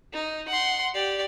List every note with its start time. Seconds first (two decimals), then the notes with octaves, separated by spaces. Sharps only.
0.13 D#4
0.48 F#5 C6
0.94 G4 D5